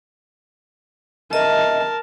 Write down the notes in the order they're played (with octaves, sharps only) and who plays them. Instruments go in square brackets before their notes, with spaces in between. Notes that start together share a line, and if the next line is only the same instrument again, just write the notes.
[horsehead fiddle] A#4 A5 [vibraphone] D#5 E5